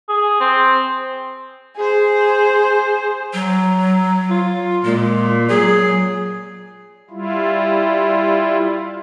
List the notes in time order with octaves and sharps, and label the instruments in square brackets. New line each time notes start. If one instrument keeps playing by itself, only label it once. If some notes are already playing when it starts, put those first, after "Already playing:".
[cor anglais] G#4
C4
[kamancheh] G#4 C5
[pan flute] F#3
[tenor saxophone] F4
[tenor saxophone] A#2 [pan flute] G#3
[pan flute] F#3 [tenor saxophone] G#4
[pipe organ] G3 E4 F4